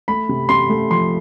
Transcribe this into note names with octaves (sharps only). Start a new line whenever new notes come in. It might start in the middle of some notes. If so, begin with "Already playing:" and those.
A3 B5
C3
C3 C6
A3
F3 C6